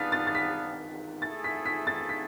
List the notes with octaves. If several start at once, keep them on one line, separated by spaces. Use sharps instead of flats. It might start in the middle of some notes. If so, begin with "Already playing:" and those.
Already playing: B3 D4 G#4 B4 F5 A6 B6
A6
A6
B6
A3 E4 G#4 A6
B6
B6
A6
B6